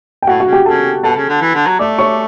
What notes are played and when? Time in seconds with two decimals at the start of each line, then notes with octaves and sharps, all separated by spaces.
0.22 G5
0.27 A2 F#4 F#5
0.40 F#4 F#5
0.46 C#3
0.53 G4 G5
0.65 C#3 A4 A5
1.03 B2 A4 A5
1.17 C#3
1.29 D3
1.41 E3
1.55 D3
1.67 F#3
1.79 A3 D5 D6
1.99 C#5 C#6